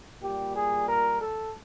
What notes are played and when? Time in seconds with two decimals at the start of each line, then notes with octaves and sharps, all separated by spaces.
0.21 A#2 G3 G4
0.55 G#4
0.88 A#4
1.20 A4